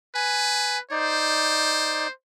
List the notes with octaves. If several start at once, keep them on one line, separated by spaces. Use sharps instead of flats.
B4 G#5
D#4 C5 D5